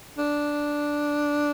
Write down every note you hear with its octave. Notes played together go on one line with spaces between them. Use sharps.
D4